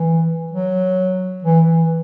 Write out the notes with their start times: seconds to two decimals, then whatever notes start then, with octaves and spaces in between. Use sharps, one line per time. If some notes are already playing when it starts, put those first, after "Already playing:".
Already playing: E3
0.53 F#3
1.44 E3
1.67 E3